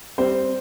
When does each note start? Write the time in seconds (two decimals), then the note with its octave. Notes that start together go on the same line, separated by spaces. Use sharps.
0.18 G3 C4 C5